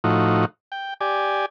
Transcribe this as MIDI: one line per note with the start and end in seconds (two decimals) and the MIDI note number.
0.04 0.45 45
0.04 0.45 53
0.04 0.45 63
0.04 0.45 66
0.72 0.94 79
1.01 1.46 67
1.01 1.46 74
1.01 1.46 80